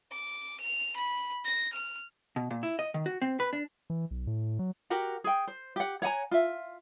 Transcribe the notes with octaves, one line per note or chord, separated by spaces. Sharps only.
D6
F7
B5
A#6
F6
B2
A#2
E4
D#5
D#3
F#4
C4
B4
D4
E3
B1
A2
F#3
F#4 G4 A#4 F#5
G#4 G5
C5
G4 F#5
C#5 F#5 G#5 A#5
F4 E5